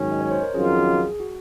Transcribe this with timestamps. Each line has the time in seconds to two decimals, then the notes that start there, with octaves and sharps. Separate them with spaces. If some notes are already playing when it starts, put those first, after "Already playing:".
Already playing: G#2 D#3 F#3 C#4
0.12 D#5
0.21 C#5
0.31 C5
0.42 A#4
0.54 F2 D#3 F#3 C#4 F4 G#4
0.64 G#4
0.75 G#4
1.20 F#4